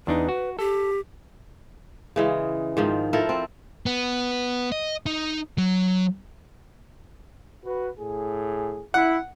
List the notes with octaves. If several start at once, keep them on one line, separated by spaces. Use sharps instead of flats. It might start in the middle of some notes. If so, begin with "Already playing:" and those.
E2 D4 D#4 B4
F#4
G4 A4
C#3 E3 G#3
G#2 D#3 F3
F3 E4 A4 A#4
C4
B3
D#5
D#4
F#3
F#4 B4
A2 G#4
E4 F#5